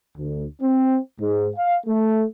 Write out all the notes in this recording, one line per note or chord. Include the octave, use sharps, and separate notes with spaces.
D2
C4
G#2
F5
A3